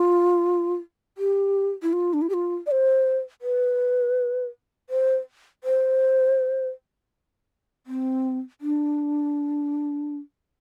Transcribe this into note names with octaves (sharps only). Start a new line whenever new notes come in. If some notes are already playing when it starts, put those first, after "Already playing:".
Already playing: F4
G4
E4
F4
D4
E4
G4
F4
D5
C5
B4
C5
C5
C4
D4